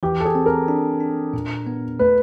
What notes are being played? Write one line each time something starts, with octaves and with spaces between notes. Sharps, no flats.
E3 G4
A4
G#4
C4
A#4
D4
D4
A#2
B3
A3 B4